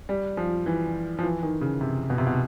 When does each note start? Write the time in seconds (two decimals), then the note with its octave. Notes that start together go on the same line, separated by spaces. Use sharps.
0.09 G3
0.37 F3
0.66 E3
1.19 F3
1.23 E3
1.43 D#3
1.61 C#3
1.81 C3
2.10 B2
2.18 C3
2.27 B2